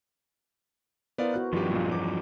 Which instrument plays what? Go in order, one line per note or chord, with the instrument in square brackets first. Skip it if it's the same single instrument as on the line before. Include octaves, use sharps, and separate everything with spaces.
[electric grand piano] B3 D5 F5 [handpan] E4 A#4 C5
[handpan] B3 F#4 B4 [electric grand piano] F#6
[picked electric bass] G2 F3 [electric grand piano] D#3 G4
[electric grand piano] B1 A#2 G3 [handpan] F#3
[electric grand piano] E2 D6